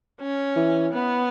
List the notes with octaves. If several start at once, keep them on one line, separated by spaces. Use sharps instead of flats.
C#4
E3
B3